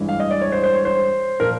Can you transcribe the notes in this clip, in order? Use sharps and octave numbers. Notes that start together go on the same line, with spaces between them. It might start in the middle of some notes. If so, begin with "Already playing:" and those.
Already playing: A1 G2 E3 G#3
F5
D#5
D5
C#5
C5
C5
C#5
C5
A#2 F3 A#4